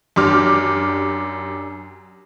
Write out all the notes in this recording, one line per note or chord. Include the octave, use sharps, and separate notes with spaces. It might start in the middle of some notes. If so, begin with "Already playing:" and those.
F#2 D4 G4 D6 F6